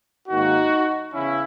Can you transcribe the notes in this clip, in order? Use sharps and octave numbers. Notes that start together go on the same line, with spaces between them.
G#2 D#3 A#3 D#4 F#4
E2 C#3 C#4 E4